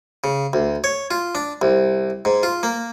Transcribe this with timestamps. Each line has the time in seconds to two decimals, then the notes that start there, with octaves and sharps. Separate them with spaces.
0.24 C#3
0.53 D2
0.84 C#5
1.11 F4
1.35 D4
1.62 C2
2.25 G#2
2.43 F4
2.63 A#3